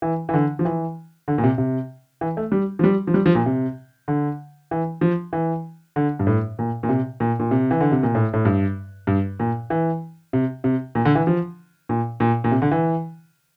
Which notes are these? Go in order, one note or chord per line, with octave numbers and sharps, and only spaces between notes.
E3
E3
D3
F3
E3
D3
A#2
C3
C3
E3
A3
G3
F3
G3
F3
G3
F3
A#2
C3
D3
E3
F3
E3
D3
G2
A2
A#2
A#2
C3
A#2
A#2
C3
E3
D3
C3
A#2
A2
A2
G2
G2
A#2
E3
C3
C3
A#2
D3
E3
F3
A#2
A#2
A#2
C3
D3
E3